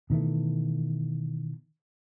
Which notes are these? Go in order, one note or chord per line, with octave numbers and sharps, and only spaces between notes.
B2 D#3 E3 A3